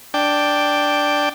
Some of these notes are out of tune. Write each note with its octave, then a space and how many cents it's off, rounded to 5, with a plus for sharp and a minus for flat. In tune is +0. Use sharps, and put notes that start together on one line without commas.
D4 +0 G5 +0